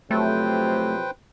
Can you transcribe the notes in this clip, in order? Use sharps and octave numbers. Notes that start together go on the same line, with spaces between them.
F2 C3 F#3 A3 B4 C5 G5